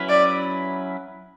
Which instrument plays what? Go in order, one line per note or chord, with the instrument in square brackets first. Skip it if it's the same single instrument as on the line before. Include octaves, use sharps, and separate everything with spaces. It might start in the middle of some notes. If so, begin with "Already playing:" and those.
Already playing: [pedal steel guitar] F#3 C#4 E4 B4
[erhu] D5